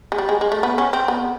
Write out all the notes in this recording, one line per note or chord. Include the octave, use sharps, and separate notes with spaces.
G#3
G3
G#3
G#3
A3
B3
C#4
C4
B3